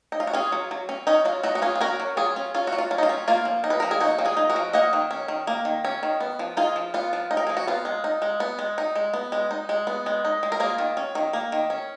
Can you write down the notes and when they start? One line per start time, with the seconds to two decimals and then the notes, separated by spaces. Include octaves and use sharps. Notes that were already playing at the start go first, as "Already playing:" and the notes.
0.12 D#4
0.20 F4
0.27 F#4
0.33 C#4 F4 G#4
0.52 F#3
0.71 F#3
0.89 C#4
1.07 C#4 D#4
1.25 F#3 F4
1.43 F#3 D#4 F#4
1.55 F#4
1.62 C#4 F4 G#4
1.76 G#4
1.81 C#4 F#4 A#4
2.00 F#3
2.17 F#3 F4 G#4
2.36 C#4
2.55 C#4 F4
2.67 F#4
2.72 F#3
2.78 F4
2.91 F#3
2.98 D#4
3.03 F4
3.09 C#4
3.28 A#3 F4
3.45 F3
3.64 D#4
3.70 B4
3.80 F3 A#4
3.91 G#4
4.00 A#3 D#4 F#4
4.19 F3
4.25 F4 G#4
4.37 D#4
4.50 F#4 A#4
4.56 F3
4.73 A#3 D#5 F#5
4.93 D#3
5.11 C#4
5.28 D#3
5.47 A#3
5.65 D#3
5.85 C#4
6.03 D#3
6.20 B3
6.39 F3
6.57 D#4 F4 G#4
6.76 F3
6.94 B3 F4
7.13 F3
7.31 D#4
7.37 A#4
7.47 F3 G#4
7.57 F#4
7.67 B3 F4
7.85 G#3
8.04 D#4
8.22 G#3
8.40 B3
8.59 G#3
8.78 D#4
8.96 G#3
9.13 B3
9.32 G#3
9.51 D#4
9.69 G#3
9.87 B3
10.06 G#3
10.25 D#4
10.43 G#3
10.52 A#4
10.60 A#3 F4 G#4
10.78 D#3
10.97 C#4
11.15 D#3
11.33 A#3
11.52 D#3
11.70 C#4